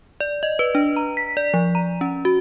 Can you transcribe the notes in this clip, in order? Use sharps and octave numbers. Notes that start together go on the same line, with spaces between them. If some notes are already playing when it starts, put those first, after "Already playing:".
D5
D#5
B4
D4
A#5
B6
D5
F3
A#5
C#4
F#4